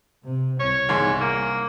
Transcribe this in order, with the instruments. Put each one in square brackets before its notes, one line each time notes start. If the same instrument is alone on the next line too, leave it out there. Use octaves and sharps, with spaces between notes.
[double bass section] C3
[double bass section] C2 [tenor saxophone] C#5
[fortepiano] E2 G#2 G#3
[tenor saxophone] A#3